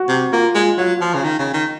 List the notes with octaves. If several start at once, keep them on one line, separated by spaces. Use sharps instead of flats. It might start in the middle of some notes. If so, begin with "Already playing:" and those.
Already playing: F#4
C3
A#3 F4
G#3 F4
F#3 F4
F3
C#3
D#3
C#3
D#3